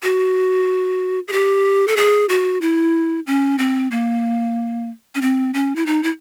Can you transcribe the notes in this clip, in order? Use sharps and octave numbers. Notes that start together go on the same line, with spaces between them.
F#4
G#4
G4
A4
G#4
F#4
E4
C#4
C4
A#3
C#4
C4
C#4
E4
D#4
E4